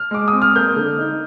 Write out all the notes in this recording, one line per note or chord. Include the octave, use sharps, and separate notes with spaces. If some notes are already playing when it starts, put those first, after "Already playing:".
Already playing: F6
G#3 D6
D#6
C4
F6
A#3 G6
D3
D#4